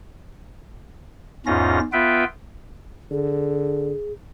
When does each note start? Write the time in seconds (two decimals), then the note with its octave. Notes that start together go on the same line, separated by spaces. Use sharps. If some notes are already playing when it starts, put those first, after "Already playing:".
1.46 E2 G#2 C#4 F4 A#6
1.93 B3 F4 B4 E5 G5
3.11 D3 G#4